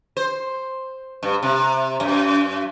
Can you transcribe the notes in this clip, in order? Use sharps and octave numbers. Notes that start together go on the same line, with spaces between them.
C5
G2
C3
F#2